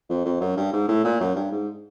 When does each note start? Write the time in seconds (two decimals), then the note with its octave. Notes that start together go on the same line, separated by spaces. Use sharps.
0.09 F2
0.25 F2
0.41 F#2
0.57 G2
0.73 G#2
0.88 A2
1.04 A#2
1.20 F#2
1.35 G2
1.52 G#2